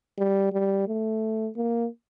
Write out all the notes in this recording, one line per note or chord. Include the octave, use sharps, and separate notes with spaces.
G3
G3
A3
A#3